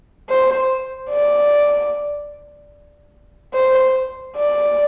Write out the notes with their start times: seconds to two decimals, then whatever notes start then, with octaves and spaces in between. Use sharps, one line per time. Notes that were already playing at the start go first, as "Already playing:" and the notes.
0.30 C5
1.10 D5
3.54 C5
4.36 D5